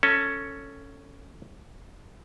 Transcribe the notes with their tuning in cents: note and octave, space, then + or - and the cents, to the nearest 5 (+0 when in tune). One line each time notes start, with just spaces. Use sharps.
C#4 +0 A4 +15